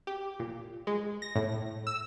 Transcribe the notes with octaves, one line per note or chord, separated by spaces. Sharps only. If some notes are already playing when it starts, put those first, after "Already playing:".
G4
A#2
G#3
A#6
A2
E6